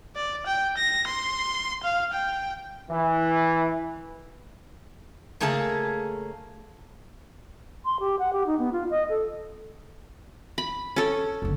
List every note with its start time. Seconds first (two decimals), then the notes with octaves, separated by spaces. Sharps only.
0.16 D5
0.46 G5
0.77 A#6
1.07 C6
1.83 F5
2.13 G5
2.90 E3
5.40 C#3 A3 A#3 G#4 A5
7.85 C6
8.00 G4
8.19 F#5
8.33 G4
8.46 D#4
8.59 B3
8.72 F4
8.90 D#5
9.09 A4
10.58 B5
10.96 C#4 A4
11.42 F#1 D3